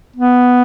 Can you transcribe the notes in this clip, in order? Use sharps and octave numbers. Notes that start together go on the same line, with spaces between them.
B3